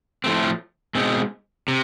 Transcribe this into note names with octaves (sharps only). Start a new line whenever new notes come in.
A2 F3 A3 C4
B2 G#3 C4 D#4
C3